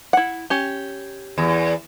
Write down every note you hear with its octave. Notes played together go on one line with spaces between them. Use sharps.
E4 F#5
C#4 G4
E2